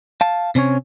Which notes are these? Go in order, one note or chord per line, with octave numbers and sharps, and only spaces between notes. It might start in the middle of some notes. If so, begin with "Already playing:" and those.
F5 A5
C3 C4 C#4 C#5